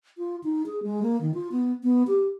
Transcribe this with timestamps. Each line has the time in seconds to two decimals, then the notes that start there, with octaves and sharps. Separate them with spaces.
0.18 F4
0.44 D#4
0.66 G#4
0.83 G#3
1.03 A#3
1.21 D#3
1.34 F4
1.52 B3
1.83 B3
2.07 G4